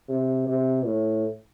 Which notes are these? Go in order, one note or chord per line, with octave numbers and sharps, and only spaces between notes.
C3
C3
A2